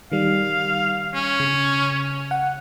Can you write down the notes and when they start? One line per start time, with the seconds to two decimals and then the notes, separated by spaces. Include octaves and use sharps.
0.12 D#3 G3 F5
1.14 C#4
1.40 C#3
2.31 F#5